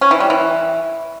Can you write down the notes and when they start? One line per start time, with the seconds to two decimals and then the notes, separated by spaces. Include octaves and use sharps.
0.01 C#4
0.11 E3
0.20 G3
0.30 E3